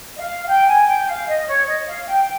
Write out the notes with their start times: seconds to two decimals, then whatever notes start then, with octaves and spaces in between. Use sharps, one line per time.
0.15 D#5
0.19 F5
0.47 G5
0.67 G#5
0.87 G5
1.08 F5
1.27 D#5
1.48 C#5
1.67 D#5
1.88 F5
2.07 G5